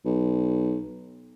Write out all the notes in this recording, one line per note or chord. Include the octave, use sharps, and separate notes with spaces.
B1